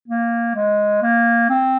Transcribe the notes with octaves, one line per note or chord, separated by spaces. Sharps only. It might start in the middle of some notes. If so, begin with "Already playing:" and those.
A#3
G#3
A#3
C4